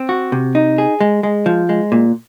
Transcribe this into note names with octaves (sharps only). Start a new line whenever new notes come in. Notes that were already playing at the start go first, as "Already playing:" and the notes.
Already playing: C4
F#4
C3
D#4
G#4
G#3
G#3
F3
G#3
A#2